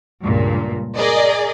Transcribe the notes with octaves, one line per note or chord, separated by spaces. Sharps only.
C#2 G2 A#2
G#4 A#4 D5 D#5